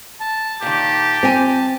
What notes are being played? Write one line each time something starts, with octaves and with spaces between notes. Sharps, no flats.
A5
A#2 D#3 G4
C4 F4 G#5